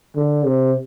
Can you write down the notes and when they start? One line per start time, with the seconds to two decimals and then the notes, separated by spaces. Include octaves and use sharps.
0.16 D3
0.46 C3